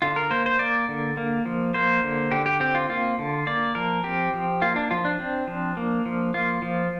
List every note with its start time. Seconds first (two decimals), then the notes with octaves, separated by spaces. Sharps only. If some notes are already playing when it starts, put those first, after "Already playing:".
0.02 D3 F4
0.16 A#4
0.31 A#3 C5
0.46 C5
0.59 A#3 D5
0.88 D3
1.17 A#3
1.45 F3
1.74 A#3 C5
2.03 D3
2.31 D3 G4
2.46 G4
2.60 C4 G4
2.75 F4
2.89 A#3 F4
3.19 D3
3.47 A#3 D5
3.75 F3 A#4
4.04 C4 G4
4.34 F3
4.62 A#3 F4
4.76 D4
4.91 F3 F4
5.05 D4
5.19 C4
5.47 F3
5.77 A#3
6.06 F3
6.34 A#3 F4
6.62 F3